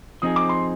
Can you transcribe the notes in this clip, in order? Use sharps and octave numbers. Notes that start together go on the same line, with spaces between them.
F3 C4 D#4 G#4 D#6
D6
C6